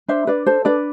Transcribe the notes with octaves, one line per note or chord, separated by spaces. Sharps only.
D4 C5 E5
D4 B4 D5
A4 C5
D4 B4 D5